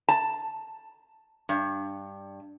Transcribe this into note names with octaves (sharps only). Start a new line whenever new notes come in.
A5
G2